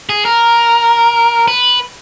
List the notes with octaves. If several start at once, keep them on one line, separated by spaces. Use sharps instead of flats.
G#4
A#4
B4